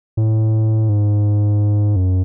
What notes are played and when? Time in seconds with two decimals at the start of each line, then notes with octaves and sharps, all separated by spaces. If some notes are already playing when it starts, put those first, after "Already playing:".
0.17 A2
0.89 G#2
1.96 F#2